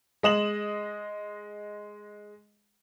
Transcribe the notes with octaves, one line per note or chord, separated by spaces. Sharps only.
G#3 D#5 E7 F#7